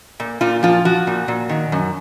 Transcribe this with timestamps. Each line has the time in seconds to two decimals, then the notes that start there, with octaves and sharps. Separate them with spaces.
0.20 A#2
0.41 A#2 F4
0.63 F3 F4
0.85 F3 F#4
1.07 A#2
1.28 A#2
1.49 D#3
1.72 F#2